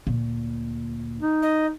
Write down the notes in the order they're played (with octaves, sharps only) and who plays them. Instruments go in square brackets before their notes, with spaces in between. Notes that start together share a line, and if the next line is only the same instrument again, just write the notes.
[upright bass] D2 A#2
[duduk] D#4
[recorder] D#5